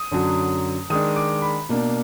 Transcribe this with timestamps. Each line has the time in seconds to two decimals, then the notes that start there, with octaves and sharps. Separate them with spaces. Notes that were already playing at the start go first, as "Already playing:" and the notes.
Already playing: D#6
0.11 F#2 D3 F#3
0.90 D#3 G#3 D4 D#6
1.16 D6
1.42 B5
1.69 B2 A#3 D4